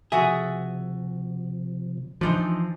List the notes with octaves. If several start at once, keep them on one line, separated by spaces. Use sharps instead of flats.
C3 F3 F#4 G#4 A4 E5
E3 F3 D4 D#4 C5